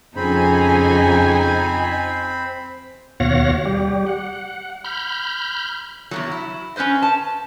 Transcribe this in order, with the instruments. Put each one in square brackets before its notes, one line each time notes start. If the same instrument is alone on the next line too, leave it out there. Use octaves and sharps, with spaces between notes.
[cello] F2 [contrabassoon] C#3 [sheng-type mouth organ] C4 C5 B5 [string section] D#4 G#5
[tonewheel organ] D#2 B2 C#5 F5 F#5 A#6
G3 G4
F#5
B5 F6 G6
[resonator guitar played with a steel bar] E2 G2 F#3
E4
C#4 F4 B4 C5 D#5
A5